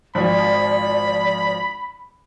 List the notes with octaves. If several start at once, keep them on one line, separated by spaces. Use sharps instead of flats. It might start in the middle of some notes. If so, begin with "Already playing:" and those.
G#1 F3 D5 B5